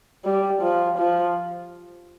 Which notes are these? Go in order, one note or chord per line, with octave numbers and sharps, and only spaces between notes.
G3
F3
F3